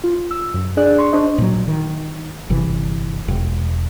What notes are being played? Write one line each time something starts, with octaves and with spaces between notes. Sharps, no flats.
F4
E6
F#2
D4 G#4 D5 F#6
C6 C#6
D4 C5 D#5
A#2 F#3
D#3
G1 C3 E3
E1